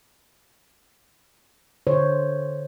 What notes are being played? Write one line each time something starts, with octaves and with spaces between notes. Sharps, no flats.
D3 C5 C#5